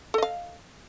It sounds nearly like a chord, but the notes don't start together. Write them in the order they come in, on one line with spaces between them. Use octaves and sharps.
A4 D#5 F5